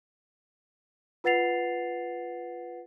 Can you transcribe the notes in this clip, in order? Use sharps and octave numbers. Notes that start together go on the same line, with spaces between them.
F4 B4 F#5 A6 C7 F7